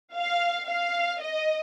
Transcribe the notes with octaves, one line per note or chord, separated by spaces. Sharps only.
F5
F5
D#5